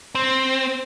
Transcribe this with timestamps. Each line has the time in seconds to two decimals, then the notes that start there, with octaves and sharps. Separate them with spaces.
0.15 C4